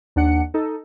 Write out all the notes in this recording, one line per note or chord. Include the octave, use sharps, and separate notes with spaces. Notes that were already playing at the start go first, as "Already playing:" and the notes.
D#2 D4 F#5 C#7
D#4 A4